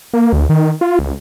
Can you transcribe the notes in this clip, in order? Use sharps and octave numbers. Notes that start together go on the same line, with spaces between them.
A#3
D2
D#3
F4
C#2